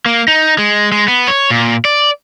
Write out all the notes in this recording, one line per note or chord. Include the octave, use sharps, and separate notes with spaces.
A#3
D#4
G#3
G#3
B3
C#5
A#2
D5